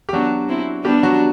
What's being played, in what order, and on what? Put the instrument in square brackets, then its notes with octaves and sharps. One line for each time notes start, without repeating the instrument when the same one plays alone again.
[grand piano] G4
[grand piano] F#3 F#4 [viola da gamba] B3 D4
[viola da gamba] C4 E4
[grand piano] G3 G4 [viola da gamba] B3 D4
[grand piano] F#3 F#4